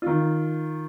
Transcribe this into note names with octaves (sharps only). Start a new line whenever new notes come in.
D#3 F4